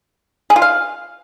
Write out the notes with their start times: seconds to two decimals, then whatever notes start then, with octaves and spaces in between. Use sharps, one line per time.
0.50 G#4
0.56 F4
0.62 F5